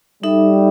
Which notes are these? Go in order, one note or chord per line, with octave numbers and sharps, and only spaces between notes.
G3 D#4 A4 E5